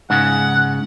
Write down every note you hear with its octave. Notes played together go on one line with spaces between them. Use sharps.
G#2 C#3 F#5